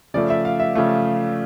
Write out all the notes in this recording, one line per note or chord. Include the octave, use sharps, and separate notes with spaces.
C#3 F3 A3 D5
E5
F5
E5
C#3 F3 A3